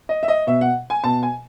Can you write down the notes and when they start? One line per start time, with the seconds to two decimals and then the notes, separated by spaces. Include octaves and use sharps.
0.09 D#5
0.23 E5
0.28 D#5
0.47 B2 E5
0.61 F#5
0.90 G#5
1.04 B2 A5
1.23 G#5